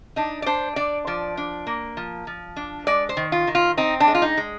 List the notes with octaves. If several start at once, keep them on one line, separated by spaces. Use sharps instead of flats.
D4 D#4
D5
D4 C5
D4 D5
F3 D5
D4
A#3
F3
F3
D4
G#3 D5
C5
D#3
F4
D#3
F4
C4 D#4
D4
G#3
F4
D#4
G#3